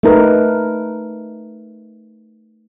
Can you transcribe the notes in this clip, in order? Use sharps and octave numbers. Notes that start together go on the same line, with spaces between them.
A3 D#4 A#4 B4